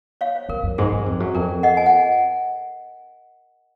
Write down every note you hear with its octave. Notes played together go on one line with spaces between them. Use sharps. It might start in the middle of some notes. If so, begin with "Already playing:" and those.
C#5 F5
C5
F#2 A#4
F#2
G#2 G#4
F#2
F2
F#2
F2 A#4
D#5 F#5
G#5
F#5